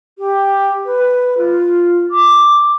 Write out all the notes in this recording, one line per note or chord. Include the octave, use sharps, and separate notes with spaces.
G4
B4
F4
D6